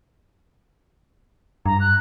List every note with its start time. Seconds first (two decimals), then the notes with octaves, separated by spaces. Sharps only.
1.66 G2 A#5
1.80 F#6